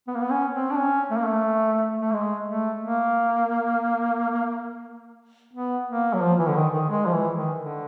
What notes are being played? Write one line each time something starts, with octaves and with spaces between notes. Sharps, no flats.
B3
A#3
B3
C#4
C4
D4
C#4
A3
A#3
A3
A3
G#3
A3
A#3
B3
A#3
F#3
F3
E3
D3
D#3
D#3
G#3
F3
E3
D#3
D3